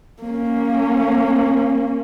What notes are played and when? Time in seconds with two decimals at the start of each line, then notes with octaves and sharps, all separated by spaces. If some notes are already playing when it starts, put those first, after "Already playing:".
0.23 A#3 C#4